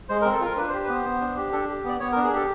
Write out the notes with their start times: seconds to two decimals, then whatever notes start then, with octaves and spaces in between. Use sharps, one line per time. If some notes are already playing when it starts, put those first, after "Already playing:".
0.09 G#3 C5
0.22 A#4
0.25 C4
0.32 A4
0.41 F4 A#4
0.56 D4 B4
0.69 C5
0.73 G4
0.84 B4
0.89 B3 C5
1.05 B3
1.21 D4
1.37 G4
1.52 D4 A4
1.69 G4
1.84 B3 D5
2.00 B3 C#5
2.12 A#4
2.17 D4
2.24 G#4
2.33 G4 A4